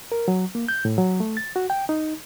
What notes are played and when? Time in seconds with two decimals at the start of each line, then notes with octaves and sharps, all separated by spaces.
0.12 A#4
0.28 F#3
0.55 A#3
0.69 G6
0.85 A2
0.98 F#3
1.20 A3
1.37 A6
1.56 F#4
1.70 G5
1.89 D#4